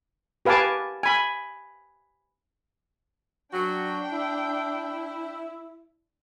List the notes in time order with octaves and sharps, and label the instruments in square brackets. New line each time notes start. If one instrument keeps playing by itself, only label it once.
[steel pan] G4 B4 F5 G#5 A5 D6
G#5 B5
[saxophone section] F#3 F#4 [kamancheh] D4 G5
[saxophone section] E4